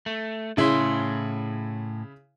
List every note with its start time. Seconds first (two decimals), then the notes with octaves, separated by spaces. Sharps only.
0.06 A3
0.57 A2 C#3 E4 G#4 C6